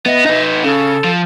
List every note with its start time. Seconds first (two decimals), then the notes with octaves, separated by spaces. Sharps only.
0.06 B3 D#5 E5
0.26 D#4 B4
0.64 C#3 A4
1.05 F3